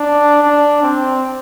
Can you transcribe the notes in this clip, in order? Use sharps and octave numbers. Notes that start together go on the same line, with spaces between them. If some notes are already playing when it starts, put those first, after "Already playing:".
Already playing: D4
D4
C4